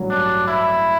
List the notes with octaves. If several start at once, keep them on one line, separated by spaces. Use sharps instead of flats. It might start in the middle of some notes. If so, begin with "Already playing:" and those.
Already playing: A1 G2 F#3
D4
E4